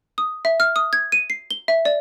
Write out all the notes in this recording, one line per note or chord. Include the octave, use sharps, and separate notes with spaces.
D#6
E5
F6
D#6
G#6
D#7
C7
G7
E5
D5